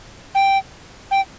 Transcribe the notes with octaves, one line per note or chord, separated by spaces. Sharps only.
G5
G5